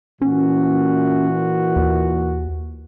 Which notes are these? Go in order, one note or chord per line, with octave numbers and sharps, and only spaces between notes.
A#2 E3 C#4 F#4
D#2